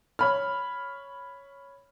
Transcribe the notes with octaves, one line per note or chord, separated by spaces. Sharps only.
C#5 B5 F6